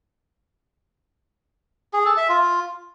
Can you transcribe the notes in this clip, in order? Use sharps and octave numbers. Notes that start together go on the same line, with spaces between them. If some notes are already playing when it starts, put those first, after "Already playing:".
G#4
A4
E5
F4